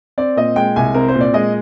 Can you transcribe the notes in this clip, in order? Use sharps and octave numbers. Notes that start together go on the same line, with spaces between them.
C4 D5
A#2 D#5
G#3 G5
C2 G#5
C4 A#4
C5
A#2
D5
G#3 D#5